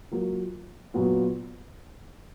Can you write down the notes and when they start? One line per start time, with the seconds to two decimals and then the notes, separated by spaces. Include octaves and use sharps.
0.12 F#3 A#3 F4
0.94 A#2 F#3 B3 F4